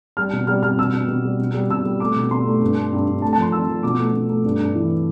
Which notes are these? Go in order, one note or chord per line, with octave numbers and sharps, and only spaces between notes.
G3 F6
B2
G3 F6
G3 F6
B2 E6
B2
B2
G3
B2
G3
B2 E6
G3
A3 D6
B2
B2 C6
A3
G2
A3
G2
G2
A3 A5
A5
F3 C6
F3 E6
F3
B2 D6
A3
B2
A3
G2
G2
E3